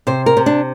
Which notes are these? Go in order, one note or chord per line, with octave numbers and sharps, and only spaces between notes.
C3 C5
A#4
C3
D4